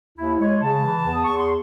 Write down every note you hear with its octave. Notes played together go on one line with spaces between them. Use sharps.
D#2 E4
G#3 C#5
C#3 A5
E3
E2
D#6
E2 C#6
C6